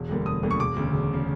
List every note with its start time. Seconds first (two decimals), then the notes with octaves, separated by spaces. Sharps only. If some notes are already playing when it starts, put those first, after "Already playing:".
Already playing: E1
0.09 D2 D3 G3 A#3
0.26 E1 D#6
0.43 D2 D3 G3 A#3
0.51 C#6
0.60 E1 D6
0.76 D2 C#3
0.94 E1
1.13 C#3